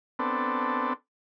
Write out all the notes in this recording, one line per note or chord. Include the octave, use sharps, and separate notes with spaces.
B3 C4 D4 A4